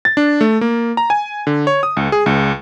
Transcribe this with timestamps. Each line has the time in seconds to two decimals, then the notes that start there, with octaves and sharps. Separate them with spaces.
0.05 A6
0.17 D4
0.41 A3
0.61 A#3
0.97 A#5
1.10 G#5
1.47 D3
1.67 C#5
1.83 D#6
1.97 C#2
2.12 G#4
2.26 C#2